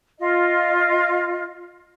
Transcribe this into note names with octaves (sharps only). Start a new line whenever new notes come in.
F4 D#5